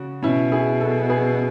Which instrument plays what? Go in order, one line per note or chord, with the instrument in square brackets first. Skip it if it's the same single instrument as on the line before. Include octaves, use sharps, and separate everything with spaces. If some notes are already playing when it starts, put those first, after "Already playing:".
Already playing: [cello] C#3 [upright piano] F#4
[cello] B2 [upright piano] C#4 E4
[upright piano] E4 G#4
F#4 A4
G#4 B4